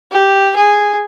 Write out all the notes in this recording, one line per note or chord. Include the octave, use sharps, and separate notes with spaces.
G4
G#4